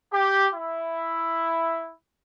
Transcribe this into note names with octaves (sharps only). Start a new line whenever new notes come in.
G4
E4